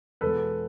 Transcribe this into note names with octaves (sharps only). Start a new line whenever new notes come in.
E2 B2 G#3 A4 B4